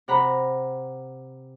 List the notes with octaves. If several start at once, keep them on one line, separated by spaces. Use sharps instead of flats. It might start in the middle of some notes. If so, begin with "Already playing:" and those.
C3 F#5 A#5 B5